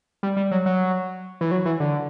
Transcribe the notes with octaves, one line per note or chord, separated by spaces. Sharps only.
G3
G3
F#3
F#3
E3
F#3
E3
D3